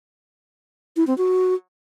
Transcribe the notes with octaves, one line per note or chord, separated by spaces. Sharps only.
E4
C4
F#4